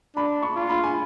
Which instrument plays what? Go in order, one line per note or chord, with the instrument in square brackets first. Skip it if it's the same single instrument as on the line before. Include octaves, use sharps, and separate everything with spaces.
[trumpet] D4 [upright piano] B5
[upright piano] C#6
[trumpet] F4
[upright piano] B5
G#5